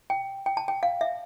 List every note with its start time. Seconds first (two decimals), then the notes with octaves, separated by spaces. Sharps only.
0.10 G5
0.46 G5
0.57 A5
0.68 G5
0.83 F5
1.01 E5